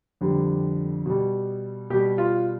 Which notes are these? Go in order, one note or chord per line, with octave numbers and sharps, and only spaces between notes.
F2 D3 G3
B2 G3
B2 G3 G4
F4